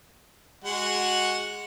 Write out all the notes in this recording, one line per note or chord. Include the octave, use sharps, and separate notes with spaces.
G#3 F#4 F#5